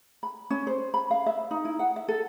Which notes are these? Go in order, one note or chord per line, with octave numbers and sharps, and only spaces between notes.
B5
C#4
C5
B5
F5
E5
D#4
E4
F#5
E5
A4